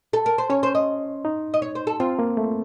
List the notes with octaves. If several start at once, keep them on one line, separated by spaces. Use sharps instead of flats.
A4
A#4
C5
C#4 C#5
C5
D#5
D#4
D#5
C#5
C5
A4
C4 F4
A#3
A3